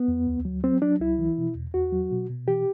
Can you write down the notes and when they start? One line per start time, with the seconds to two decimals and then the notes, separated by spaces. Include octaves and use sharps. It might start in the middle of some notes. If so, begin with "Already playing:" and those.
Already playing: B3
0.08 E2
0.27 D2
0.45 F#3
0.63 F#3 C4
0.82 F#3 D4
1.00 C2 E4
1.19 E3
1.38 B2
1.56 E2
1.74 E2 F#4
1.93 F#3
2.12 B2
2.30 B2
2.47 E3 G4